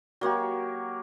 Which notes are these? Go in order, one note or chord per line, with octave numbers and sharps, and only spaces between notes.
F#3 A#3 F#4 G4